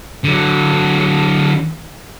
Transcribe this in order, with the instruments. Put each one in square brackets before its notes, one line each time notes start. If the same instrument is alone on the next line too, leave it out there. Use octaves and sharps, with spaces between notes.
[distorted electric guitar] D3 F#3